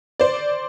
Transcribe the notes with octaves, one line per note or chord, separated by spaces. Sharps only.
C5 D5